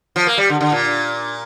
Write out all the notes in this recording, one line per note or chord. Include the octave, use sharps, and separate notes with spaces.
F3
A#3
G3
D3
D3
A#2